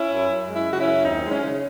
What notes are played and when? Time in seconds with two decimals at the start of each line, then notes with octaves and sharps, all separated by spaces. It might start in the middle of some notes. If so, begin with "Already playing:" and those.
Already playing: C#4 E4
0.12 F#2
0.30 F#2
0.48 G#3
0.55 C#4 E4
0.67 C#3
0.72 F#4
0.79 C#4 E4
0.86 F#2
1.04 D#2 C4 D#4
1.24 G#3
1.30 C#4
1.42 C#3